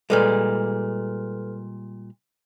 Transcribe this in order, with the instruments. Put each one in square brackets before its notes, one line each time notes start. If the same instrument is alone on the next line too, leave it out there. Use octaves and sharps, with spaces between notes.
[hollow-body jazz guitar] A#2 G3 G#3 [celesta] A4 B4 F6